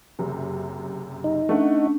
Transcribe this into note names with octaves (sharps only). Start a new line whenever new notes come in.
F#1 F#2 C3
D#4
A3 C#4 D4 F#5